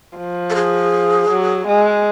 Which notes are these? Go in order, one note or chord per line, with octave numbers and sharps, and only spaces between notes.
F3
A4
G#4
F#3
G#3